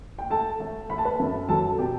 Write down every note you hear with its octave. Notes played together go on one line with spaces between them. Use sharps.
G5
A3 A4 A5
A3
A3 B5
A5
B4 B5
F#2
F#3 A4 A5
B2 G4 G5